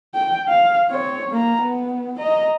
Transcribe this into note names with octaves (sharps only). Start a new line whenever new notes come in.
G5
F5
C4 C#5
A#3 A#5
B3
D#5 A#5